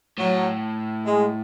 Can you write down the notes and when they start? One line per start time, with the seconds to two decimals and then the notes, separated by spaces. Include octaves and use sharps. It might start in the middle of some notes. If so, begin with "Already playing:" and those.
0.18 A2 F#3
1.05 G#3